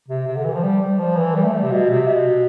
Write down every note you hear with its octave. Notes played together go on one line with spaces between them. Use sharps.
C3
C3
D3
E3
F3
G3
G3
F3
E3
G3
A3
G3
C3
B2
C3
B2